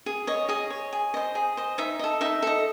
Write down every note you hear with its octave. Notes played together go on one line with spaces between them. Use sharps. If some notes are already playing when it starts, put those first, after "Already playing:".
G#4
C#5 D#5
G#4 D#5
C#5
G#4
C5 D#5
G#4
C5 D#5
D#4 E5
A4 D#5
D#4 E5
A4 D#5